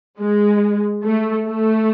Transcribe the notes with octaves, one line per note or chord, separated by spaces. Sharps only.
G#3
A3
A3